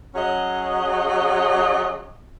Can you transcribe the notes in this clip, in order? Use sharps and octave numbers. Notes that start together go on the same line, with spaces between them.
F#3 C#4 G#4 D#5